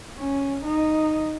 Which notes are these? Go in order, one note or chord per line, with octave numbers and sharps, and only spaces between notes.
C#4
D#4